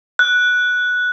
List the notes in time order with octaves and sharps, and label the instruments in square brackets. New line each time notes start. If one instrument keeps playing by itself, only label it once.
[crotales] F#6